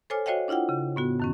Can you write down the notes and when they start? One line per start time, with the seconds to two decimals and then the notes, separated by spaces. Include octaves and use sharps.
0.10 A4 C5 C#5 G#5 D6 F6
0.26 F#4 C5 C#5 D#5 F5 G5
0.48 D4 E4 F4 F#5 G5
0.69 C#3
0.96 A2 B3 F#4
1.20 F#2 D#3 C#4